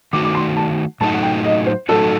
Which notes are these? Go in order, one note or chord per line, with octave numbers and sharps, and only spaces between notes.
D#3 A3 D#4 F#4 D6
D6
C6
A5
A2 F#3 A3 D#4 F#4 A5
F#5
G5
D#5
C5
A2 F#3 A3 D#4 F#4 A4